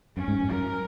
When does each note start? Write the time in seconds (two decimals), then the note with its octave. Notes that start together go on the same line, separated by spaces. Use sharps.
0.17 F#2 C#4
0.28 G#2
0.40 F#2
0.52 F#2 A#4